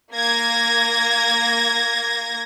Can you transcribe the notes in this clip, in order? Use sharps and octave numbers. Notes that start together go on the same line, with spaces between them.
A#3 G#6 A#6